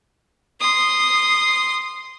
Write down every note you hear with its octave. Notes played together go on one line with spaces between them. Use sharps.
C6 D#6